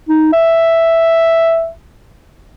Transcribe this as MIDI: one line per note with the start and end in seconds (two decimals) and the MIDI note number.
0.09 0.33 63
0.33 1.68 76